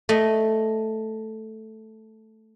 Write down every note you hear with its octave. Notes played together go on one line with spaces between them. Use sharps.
A3 D#5